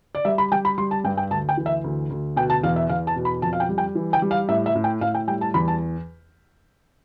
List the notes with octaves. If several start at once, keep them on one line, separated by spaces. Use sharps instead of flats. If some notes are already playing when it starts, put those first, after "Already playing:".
D5
G3 E5
B5
G3 G5
B5
G3 C6
A5
G2 G5
G5
D2 A5
G5
E3
E5
D2
D2
B2 G5
A5
E2 F5
E5
E2 F5
A5
B2
B5
F2 A5
F5
G5
G3
G5
E3
G5
G3
F5
A2 E5
E5
A2
G5
A2 F5
G5
G3 G5
A5
E2 B5
A5